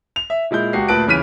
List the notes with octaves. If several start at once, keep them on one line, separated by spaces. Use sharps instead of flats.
F7
E5
A#2 G#3 E4 G6
C#2 F#4 G4 C7
D2 A#2 B4 A5 F#6 D7
D#1 C#3 E3 F6 B6 D#7